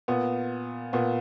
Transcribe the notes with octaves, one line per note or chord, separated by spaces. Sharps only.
A#2 B3
A#2 B3